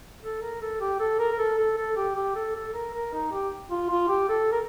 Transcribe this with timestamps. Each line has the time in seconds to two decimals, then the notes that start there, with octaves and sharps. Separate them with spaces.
0.22 A4
0.41 A#4
0.61 A4
0.81 G4
1.00 A4
1.19 A#4
1.32 A#4
1.39 A4
1.58 A4
1.77 A4
1.96 G4
2.15 G4
2.35 A4
2.55 A4
2.74 A#4
2.94 A#4
3.13 D#4
3.32 G4
3.71 F4
3.90 F4
4.09 G4
4.29 A4
4.52 A#4